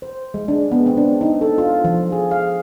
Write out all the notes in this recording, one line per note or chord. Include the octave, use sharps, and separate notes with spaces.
C5
G#3
D4
B3
C4
D4
D#4
A4
F4
F3
G#4
F5